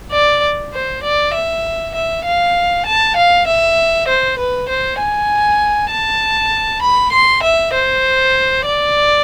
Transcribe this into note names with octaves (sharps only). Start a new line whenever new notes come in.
D5
C5
D5
E5
E5
F5
A5
F5
E5
C5
B4
C5
G#5
A5
B5
C6
E5
C5
D5